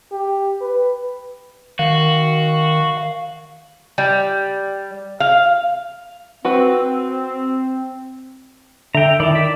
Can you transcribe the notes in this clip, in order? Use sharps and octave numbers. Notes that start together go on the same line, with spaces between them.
G4
B4
D#3 F#4 F5
G3
F5
C4 F#4 B4 C5
D3 E5 G5 A#5
D#3 E4 D5 A5
B6